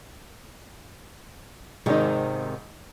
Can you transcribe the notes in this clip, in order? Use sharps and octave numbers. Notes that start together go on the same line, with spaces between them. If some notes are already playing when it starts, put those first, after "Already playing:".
G#1 G#2 C3 D#3 D#4